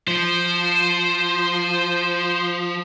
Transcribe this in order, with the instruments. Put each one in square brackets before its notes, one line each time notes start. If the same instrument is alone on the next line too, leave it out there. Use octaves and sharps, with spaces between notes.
[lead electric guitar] F3 [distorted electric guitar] C5